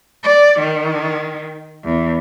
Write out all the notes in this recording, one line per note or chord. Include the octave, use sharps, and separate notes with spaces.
D5
D#3
E2